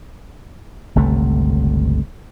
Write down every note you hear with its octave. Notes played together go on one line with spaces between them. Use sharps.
G1 C#2 C3 A3